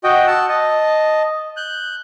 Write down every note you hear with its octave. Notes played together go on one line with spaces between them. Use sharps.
F#4 D#5 G5
F#5 A5 E6
D#5 A5
F#6 G6